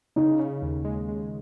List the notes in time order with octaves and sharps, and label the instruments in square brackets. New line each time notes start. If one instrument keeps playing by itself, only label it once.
[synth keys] C#3 [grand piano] D#4
[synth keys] C#3
D#2
G#3
G#3